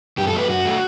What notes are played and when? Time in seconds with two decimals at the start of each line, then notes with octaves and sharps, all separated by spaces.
0.18 F#2 G4
0.27 A4
0.33 F#3 A3 B4
0.49 F#2 F#4
0.65 F#3 A3